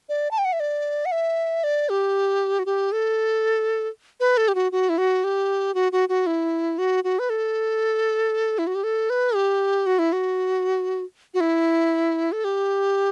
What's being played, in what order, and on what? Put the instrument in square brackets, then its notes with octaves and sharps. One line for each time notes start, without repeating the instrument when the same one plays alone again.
[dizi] D5
A5
G5
F#5
E5
D5
F#5
E5
D5
G4
F#4
G4
A4
B4
A4
G4
F#4
F#4
E4
F#4
G4
F#4
F#4
F#4
E4
F#4
F#4
B4
A4
E4
F#4
G4
A4
B4
G4
F#4
E4
F#4
F#4
E4
A4
G4